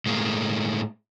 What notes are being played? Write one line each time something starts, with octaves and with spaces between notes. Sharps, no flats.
A2 G#3 A#3